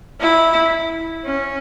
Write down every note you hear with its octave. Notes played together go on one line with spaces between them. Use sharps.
E4
C#4